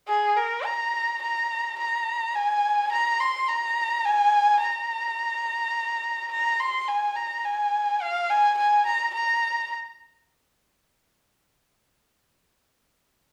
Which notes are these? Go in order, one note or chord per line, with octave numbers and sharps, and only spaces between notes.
G#4
A#4
A#5
A#5
A#5
G#5
A#5
C6
A#5
G#5
A#5
A#5
C6
G#5
A#5
G#5
F5
G#5
G#5
A#5
A#5